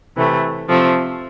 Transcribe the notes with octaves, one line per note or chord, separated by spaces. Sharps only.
C3 E3 A3
C3 F3 A3 C4